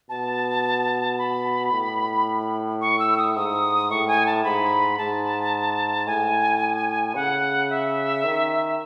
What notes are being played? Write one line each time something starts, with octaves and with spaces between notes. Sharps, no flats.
B2 A5
B5
A2
C#6
E6
D#6
G#2 D#6
A2 C#6
G#5
A5
G#2 B5
G#2 A5
A2 G#5
C#3 F#5
E5
D#3